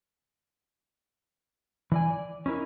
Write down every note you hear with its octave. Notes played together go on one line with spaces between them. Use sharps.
E3 D5 G#5
D5
C#4 D#4 E4 A#4